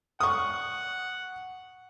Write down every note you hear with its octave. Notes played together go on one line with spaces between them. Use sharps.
F#5 C#6 D#6